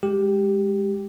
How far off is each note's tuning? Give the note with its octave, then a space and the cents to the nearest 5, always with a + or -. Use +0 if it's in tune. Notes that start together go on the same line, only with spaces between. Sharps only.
G#3 -15 G4 +0